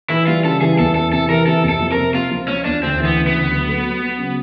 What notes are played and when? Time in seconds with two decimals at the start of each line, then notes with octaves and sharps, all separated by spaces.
0.10 E3 E4
0.27 G3 F4
0.44 C#3 A4
0.61 E3 G#4
0.78 E2 A4
0.95 E3 A4
1.13 C3 A4
1.29 E3 A#4
1.46 C3 A4
1.63 F2
1.70 A4
1.80 F3
1.92 A#4
1.97 C3
2.14 C3 F4
2.31 F3
2.48 F3 C#4
2.65 E2 D4
2.82 D2 C4
3.00 E3
3.05 B3
3.16 C#3
3.27 B3
3.33 D2
3.50 F#3
3.68 A3
3.84 F#3
4.01 F#3
4.18 C#3